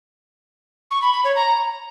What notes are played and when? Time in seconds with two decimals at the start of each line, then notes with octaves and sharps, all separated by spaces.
0.90 C#6
1.02 B5
1.13 B5
1.24 C#5
1.35 A#5